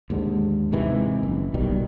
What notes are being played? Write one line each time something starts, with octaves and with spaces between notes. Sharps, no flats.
D#2 G#2 D3
G#2 C3 D#3 E3
F#1
B1 B2 D#3 G3